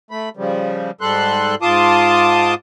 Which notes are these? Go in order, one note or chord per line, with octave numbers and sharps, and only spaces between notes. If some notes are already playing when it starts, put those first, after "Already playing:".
A3 B5
C#3 F3 G3
G#2 G3 A4 C6 F#6
G#2 F4 A5 C6 D6 D#6